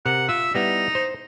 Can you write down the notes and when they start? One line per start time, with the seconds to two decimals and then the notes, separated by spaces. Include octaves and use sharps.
0.06 C3 A#4 F#5
0.29 F4 E5
0.54 G3 B3 D#4 E4
0.95 C5